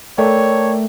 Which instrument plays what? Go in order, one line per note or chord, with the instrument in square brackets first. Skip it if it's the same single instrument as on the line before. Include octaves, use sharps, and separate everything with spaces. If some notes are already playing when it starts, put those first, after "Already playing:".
[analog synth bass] A3 [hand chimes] A#4 D5 G5 [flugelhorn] C#5